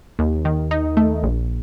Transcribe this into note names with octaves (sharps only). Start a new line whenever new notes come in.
D#2
D#3
D#4
A3
A#1